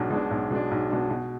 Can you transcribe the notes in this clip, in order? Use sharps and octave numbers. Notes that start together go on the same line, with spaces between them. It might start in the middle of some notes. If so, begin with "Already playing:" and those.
Already playing: B1 B2 G#3 D4
B2 G#3 D4
B1
B2 G#3 D4
B1
B2 G#3 D4
B2